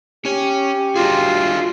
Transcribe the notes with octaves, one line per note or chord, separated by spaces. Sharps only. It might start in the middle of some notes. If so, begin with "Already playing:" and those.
C#4 G4 C#5
D4 F4 F#4 G#4